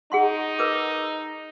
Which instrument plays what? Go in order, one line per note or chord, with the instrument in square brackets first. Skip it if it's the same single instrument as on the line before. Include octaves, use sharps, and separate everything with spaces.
[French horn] D#4 [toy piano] G#4 F#5 C6
[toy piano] A#4 B4 D6